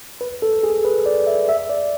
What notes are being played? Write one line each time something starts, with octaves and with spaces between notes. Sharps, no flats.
B4
A4
G#4
B4
D5
E5
E5
D5